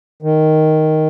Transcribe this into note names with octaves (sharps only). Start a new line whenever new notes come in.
D#3